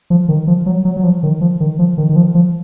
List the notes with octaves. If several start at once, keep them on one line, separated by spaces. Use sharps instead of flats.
F3
D#3
F3
F#3
F#3
F#3
F3
D#3
F3
D#3
F3
D#3
D#3
F3
F3